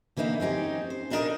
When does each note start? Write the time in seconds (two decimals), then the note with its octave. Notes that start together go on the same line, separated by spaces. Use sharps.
0.17 D3 E3 A#3 D#4 E4
0.40 C4 C#4 D#4 G4
0.90 C5
1.10 A#2 D4 D#4 F4 A#4 D#5